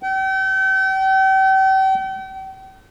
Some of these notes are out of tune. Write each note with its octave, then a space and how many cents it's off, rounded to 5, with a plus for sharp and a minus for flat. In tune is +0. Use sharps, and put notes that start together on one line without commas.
G5 -40